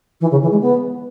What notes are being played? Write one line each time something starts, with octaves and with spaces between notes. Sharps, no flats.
E3
C#3
E3
G#3
B3